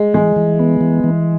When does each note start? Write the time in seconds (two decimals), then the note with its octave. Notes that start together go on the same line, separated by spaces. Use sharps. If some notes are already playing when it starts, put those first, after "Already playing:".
Already playing: G#3
0.14 E3 G#3
0.36 E3
0.59 B3
0.81 E3
1.04 E3